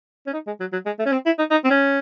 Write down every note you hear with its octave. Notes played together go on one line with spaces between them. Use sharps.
C#4
D#4
G#3
F#3
F#3
G#3
A3
C#4
C4
E4
D#4
D#4
C4
C#4